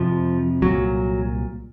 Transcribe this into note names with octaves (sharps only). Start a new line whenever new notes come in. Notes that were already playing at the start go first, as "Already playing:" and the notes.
Already playing: F2 C3 F3
C2 A#2 F#3